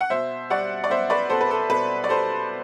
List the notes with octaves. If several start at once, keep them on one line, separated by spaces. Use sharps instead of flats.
F#5
B2 C5 E5
G3 D5 F#5
D5
B3 C5 E5
B4 D5
B2 A4 C5
B4
A4
B2 B4
D5
G3 A4 C5